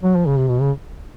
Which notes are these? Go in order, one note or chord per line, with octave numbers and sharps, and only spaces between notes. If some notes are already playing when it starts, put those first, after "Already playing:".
F#3
F3
C#3
C3
B2
C#3